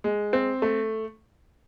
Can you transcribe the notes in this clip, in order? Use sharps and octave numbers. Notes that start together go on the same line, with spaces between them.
G#3
C4
A3